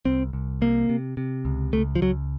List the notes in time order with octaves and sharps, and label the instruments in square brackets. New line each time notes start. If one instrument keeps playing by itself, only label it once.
[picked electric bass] C2 C4
C2
C3 A#3
C3
C3
C#2
C#2 A3
F3
C#2 F#3